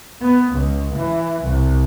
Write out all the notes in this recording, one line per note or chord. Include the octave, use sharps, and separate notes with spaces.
B3
C#2
E3
C2